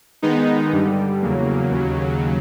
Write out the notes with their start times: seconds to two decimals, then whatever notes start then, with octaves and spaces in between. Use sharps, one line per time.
0.22 D#3 G#3 B3 D#4
0.72 G2 D3 G3
1.22 E2 C#3 F#3 A#3
1.71 D#2 C#3 F#3